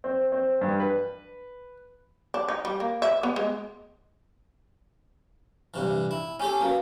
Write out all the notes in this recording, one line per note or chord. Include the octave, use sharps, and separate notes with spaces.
C4
C4
G2
B4
D4
D#4
G3
A#3
E5
B3
G#3
G2 C3 E3
E4
C#4 G4 A4 G#5
A#3 C#4 F#4 B4